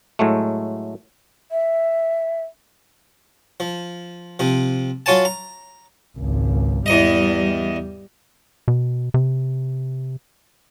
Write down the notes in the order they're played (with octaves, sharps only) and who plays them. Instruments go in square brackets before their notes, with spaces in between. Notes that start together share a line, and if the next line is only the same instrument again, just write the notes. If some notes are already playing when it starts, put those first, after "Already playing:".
[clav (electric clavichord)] A2 F#3 G#3 A3
[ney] E5
[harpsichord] F3
C3 F3
F#3 F4 C#5 G#5 A5
A#5
[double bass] G#1 C#2
[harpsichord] E2 D#5 [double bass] G3
[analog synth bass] B2
C3